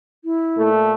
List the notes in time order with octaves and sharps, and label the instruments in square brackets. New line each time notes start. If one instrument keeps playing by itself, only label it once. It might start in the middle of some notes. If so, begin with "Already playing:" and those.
[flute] E4
[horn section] A#2 A3